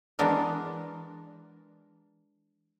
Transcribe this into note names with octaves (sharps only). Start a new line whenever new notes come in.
E3 G#3 B3 D4 A#4